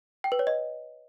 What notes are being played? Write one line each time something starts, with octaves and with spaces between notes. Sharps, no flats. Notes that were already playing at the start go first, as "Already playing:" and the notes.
G5
B4
C#5
D#5